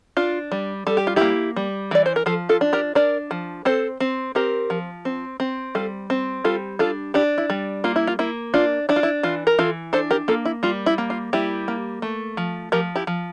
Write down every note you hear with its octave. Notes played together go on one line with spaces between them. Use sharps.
D4 F4
G3
G3 A4
G4
F4
A#3 E4 G4
G3
E3 D5
C5
A#4
F3 F4 A4
F4 A4
D4
G4 A#4
D4 A#4 D5
F3
C4 A4 C5
C4
C4 G4 A#4
F3
C4
C4
G3 F4 A4
C4
G3 F4 A4
D4 F4 A4
D4 E4 G4
E4
G3
A#3 F4
E4
F4
A#3 E4
D4 F4
D4 E4
F4
E4
E3 F4
A#4
E3 F4 A4
D4 A4 C5
G4 A#4
A#3 F4 A4
E4
G3 F4
E4
A#3
F4
G3 E4 G4
A#3
A3
F3
F3 G4 A#4
E4 G4
F3